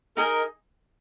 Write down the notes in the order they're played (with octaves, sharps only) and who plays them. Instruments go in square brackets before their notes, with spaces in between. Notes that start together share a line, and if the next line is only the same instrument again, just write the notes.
[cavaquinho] D#4 G#4 D#5 G#5 [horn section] A#4